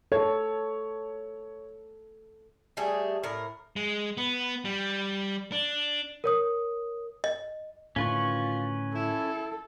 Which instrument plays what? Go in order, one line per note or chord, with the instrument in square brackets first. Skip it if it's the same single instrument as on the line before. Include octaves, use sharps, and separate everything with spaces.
[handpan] A4 [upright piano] C#5
[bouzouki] G3 A3 G#4
A2 A#4
[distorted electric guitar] G#3
B3
G3
D4
[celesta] A#4 C#5 D#6
[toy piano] D#5
[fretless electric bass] A2 D3 D#3 [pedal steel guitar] C#4 B4 C#6 [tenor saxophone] F4
[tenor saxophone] E4 [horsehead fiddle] A4